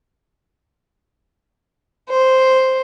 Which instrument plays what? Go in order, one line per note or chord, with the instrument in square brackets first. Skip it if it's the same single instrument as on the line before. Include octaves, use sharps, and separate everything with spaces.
[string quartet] C5